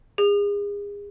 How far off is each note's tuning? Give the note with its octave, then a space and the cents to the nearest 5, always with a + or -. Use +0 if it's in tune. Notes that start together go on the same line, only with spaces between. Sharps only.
G#4 -35